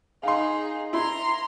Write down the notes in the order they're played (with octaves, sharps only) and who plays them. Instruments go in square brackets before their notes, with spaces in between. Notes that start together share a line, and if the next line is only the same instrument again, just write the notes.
[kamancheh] D#4 G#4 [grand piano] F5 C6
[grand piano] E4 [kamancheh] A#5 C6